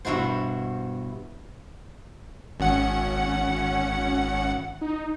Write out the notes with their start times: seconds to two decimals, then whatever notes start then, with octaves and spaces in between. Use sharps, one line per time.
0.05 G2 B2 E4 F#4 C5
2.60 G#1 C#4 F#5
4.81 D#4